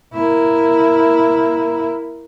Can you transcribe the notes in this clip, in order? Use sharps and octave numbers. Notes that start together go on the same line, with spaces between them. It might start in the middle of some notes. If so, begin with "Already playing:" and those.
A#3 E4